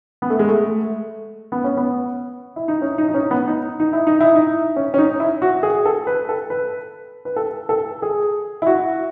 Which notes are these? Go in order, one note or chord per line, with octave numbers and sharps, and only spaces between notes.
B3
A3
G#3
A3
B3
C#4
B3
E4
D#4
C#4
D#4
D#4
C#4
B3
D#4
D#4
E4
D#4
E4
D#4
C#4
C#4
D#4
E4
F#4
G#4
A4
B4
A4
B4
B4
A4
A4
G#4
E4
F#4